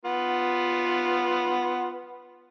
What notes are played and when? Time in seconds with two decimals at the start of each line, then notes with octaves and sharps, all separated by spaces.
0.05 B3 F4 F#5